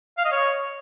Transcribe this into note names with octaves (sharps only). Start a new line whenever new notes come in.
F5
D#5
C#5